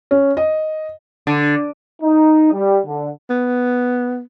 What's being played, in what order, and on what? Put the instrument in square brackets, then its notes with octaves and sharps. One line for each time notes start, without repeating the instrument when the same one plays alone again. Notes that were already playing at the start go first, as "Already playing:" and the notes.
[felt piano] C#4
D#5
[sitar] D3
[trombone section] D#4
G3
D3
[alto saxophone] B3